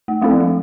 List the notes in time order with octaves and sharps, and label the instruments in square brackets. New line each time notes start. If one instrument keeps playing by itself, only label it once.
[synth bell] A3
[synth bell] G#3 [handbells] A3 C4 E4 A4
[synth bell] F3
G#3